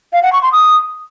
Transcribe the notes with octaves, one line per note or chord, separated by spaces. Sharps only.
F5
F#5
C#6
C6
D#6